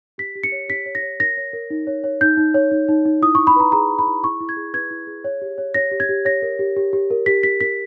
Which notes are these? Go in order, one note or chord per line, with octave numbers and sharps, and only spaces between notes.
G4 B6
G4
C#7
C#5
G4 B6
C#5
A#6
C#5
A#4 A#6
C#5
A#4
D#4
C#5
C#5
D#4 G6
D#4
C#5
D#4
D#4
D#4
E4 D#6
E4 C#6
B5
B4 A#5
G#4 A#5
G#4
B5
E4
E4 C#6
E4
G#6
G#4
B4 G#6
E4
G#4
C#5
G4
C#5
C#5 A#6
G4
G#6
G4
C#5 A#6
A#4
G4
G4
G4
A#4
G4 B6
G4 B6
A#4 B6